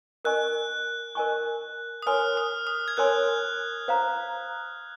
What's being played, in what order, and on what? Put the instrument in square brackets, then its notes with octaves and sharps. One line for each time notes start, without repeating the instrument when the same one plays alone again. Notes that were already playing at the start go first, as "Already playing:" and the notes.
[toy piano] A#4 D#5 G#5 C#6 [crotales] F#6
[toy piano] A#4 D#5 G#5 C#6
[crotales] D#6
[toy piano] A#4 C#5 G#5 C6 [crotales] F6
[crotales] D#6
D#6
G#6
[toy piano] A#4 C#5 G#5 C6 [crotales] F#6
[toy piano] C5 F5 A#5